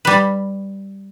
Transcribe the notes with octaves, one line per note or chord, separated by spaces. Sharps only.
G3 B4